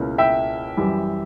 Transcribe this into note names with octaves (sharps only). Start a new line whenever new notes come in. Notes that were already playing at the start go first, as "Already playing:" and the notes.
Already playing: C#2 B2 A#3 C#4 E4
E5 G5
F#2 E3 G3